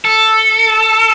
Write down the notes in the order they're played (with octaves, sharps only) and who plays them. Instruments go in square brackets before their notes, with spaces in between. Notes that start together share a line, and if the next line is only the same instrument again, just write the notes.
[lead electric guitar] A4